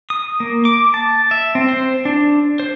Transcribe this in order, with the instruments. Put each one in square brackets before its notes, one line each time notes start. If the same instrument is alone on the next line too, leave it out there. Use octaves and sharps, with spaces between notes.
[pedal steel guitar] D#6
A#3
D6
A5
E5
C4
C5
D4
C5